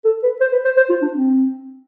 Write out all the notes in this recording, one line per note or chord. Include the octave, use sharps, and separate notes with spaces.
A4
B4
C5
B4
C5
C5
F4
D4
C4